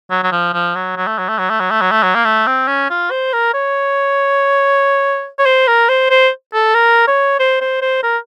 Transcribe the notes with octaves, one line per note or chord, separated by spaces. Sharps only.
F#3
F#3
F3
F3
F#3
F#3
A3
F#3
A3
F#3
A3
F#3
A3
F#3
A3
F#3
A#3
A3
C4
C#4
F4
C5
A#4
C#5
C#5
C5
A#4
C5
C5
A4
A#4
C#5
C5
C5
C5
A#4